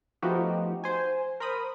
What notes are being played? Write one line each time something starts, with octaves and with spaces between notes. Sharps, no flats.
F3 A3 B3 D#4 F#4 G4
C5 G#5
A#4 C5 B5 D#6